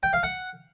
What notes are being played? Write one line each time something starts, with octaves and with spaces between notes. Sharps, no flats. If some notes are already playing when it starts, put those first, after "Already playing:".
G5
F5
F#5